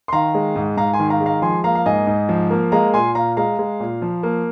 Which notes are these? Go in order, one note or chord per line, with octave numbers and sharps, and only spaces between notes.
C6
D#3 F5 A#5
G#3
G#2
G#2 F5 A#5
G#5 C6
D#3
F5 A#5
G#3
F5 A#5
F3 G#5 C6
A#3 F5 A#5
F5
G#2 D#5 G#5
G#2
F3
A#3
G#3 F5 A#5
A#2 G#5 C6
A#2 F5 A#5
G#3 F5 A#5
G#3
A#2
F3
A#3